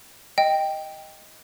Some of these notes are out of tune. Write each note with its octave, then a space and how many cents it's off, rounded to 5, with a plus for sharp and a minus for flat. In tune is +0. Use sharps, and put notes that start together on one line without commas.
D#5 +0 G5 +0